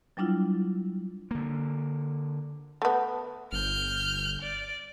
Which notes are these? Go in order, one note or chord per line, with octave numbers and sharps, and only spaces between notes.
F#3 G3 D4 E4 F4
D3 A#3
A3 B3
G1 F6 G6
D5